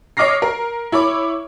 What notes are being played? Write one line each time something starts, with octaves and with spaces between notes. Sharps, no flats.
C#5 D#5 D6 F6 A#6 C7
A#4
E4 C#5 B5 D6